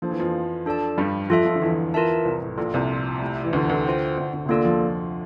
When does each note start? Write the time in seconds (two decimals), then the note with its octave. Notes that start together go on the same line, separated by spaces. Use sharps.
0.02 F3 A#3 D4 A4 C5 F5
0.11 E3
0.20 F2 F3
0.66 D4 A4 D5 A5
0.98 G2 G3
1.30 F2 F3 F4 A4 E5
1.45 F2 F3
1.56 D3
1.61 E2 E3
1.94 F4 A#4 E5 A5
2.25 C2 C3
2.42 A2
2.58 A#1 A#2 A#3 F4 A4
2.74 C2 C3
3.22 A3 E4 G4
3.44 E3
3.53 D2 D3
3.63 E3
3.69 D2 D3
3.85 F4 C5 G5
4.17 D2 D3
4.33 D2 D3
4.45 C3
4.49 D2 D3 A#3 F4 A4 D5
4.65 F2 F3